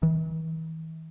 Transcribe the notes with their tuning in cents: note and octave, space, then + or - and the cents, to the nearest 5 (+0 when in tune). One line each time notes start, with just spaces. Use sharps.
E3 -45